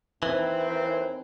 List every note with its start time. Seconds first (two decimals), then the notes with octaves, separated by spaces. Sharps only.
0.23 D#2 E3 C4